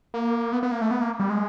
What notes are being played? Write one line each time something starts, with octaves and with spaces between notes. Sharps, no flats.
A#3
B3
B3
A#3
A3
B3
A#3
G3
G#3